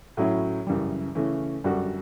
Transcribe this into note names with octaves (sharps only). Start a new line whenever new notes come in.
A2 F#3 C#4 E4
F#2 C#3 E3 G3
C#3 E3 A3 C#4
F#2 D3 G3 D4 F#4